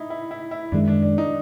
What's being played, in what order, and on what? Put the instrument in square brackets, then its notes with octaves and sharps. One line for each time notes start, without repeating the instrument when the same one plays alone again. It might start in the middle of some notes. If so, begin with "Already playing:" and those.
Already playing: [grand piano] D#4 E4
E4
E4
E4
[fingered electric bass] F#2 D#3 G#3 [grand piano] D4
[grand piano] D4
D4
D#4